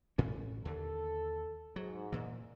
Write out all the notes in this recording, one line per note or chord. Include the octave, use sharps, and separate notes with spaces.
A1 A2 C#4
D#2 D3 A4
G#2 F#3
A#2 E3